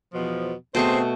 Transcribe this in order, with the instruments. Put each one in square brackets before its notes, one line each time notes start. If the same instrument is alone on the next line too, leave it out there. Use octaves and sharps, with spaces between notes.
[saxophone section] E2 B2 F3
[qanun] B2 A3 C#6 [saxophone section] C4 G#4 C5